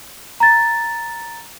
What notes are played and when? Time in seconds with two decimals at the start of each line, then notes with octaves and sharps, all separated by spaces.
0.40 A#5 A6